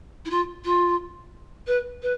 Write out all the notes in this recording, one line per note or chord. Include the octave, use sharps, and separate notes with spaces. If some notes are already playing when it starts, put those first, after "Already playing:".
E4
F4
F4
B4
B4